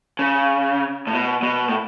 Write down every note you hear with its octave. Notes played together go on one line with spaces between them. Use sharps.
C#3
A2
B2
B2
A2